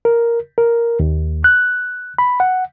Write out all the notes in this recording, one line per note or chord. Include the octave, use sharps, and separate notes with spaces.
A#4
A#4
D#2
F#6
B5
F#5